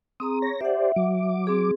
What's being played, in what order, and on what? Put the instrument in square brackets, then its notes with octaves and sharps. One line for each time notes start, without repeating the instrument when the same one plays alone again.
[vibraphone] C4 G#4 A#5 [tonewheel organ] D#6
[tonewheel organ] C#5 A#6
[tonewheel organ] G4 C5 D5 [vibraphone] E5 F#5
[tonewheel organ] F#3 D6
[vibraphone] C4 G#4